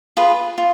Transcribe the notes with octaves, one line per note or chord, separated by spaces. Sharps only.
F4 G#4 B4
F4